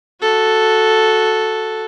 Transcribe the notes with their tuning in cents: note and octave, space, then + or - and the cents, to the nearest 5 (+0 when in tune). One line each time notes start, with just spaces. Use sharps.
F#4 -5 A4 +0